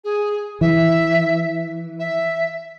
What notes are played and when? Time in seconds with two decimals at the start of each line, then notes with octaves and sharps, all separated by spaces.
0.04 G#4
0.61 E3 E5
1.99 E5